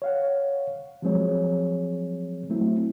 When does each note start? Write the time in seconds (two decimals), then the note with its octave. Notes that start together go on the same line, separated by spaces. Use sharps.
0.02 C#5 F5 F#5
1.02 F3 F#3 G#3 C4 G#4 C#5
2.50 F#3 A3 C4 E4